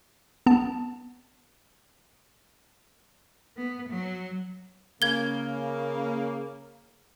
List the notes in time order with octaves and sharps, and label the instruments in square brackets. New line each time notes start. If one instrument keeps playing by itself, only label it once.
[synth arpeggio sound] B3 A5
[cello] B3
F#3
[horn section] C#3 A#3 [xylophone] G#6 G7